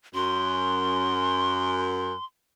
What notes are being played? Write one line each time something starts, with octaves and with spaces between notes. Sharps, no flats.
F#2 C6